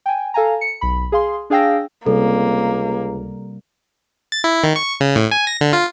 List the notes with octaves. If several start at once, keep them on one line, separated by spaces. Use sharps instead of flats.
G5 G#5
A4 F5 G#5 A#5
C#7
B1 B5
G#4 F5 C6
D4 G#4 F5 G5 E6 A#6
C#2 C3 G3 A#3 A4
A6
E4
D#3
C#6
C#3
A2
G#5
A#6
D3
F4